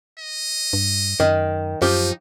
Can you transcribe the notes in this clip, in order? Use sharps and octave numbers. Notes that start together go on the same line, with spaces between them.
D#5
G2
F#2 D#3
F#2 F3 D#4 G4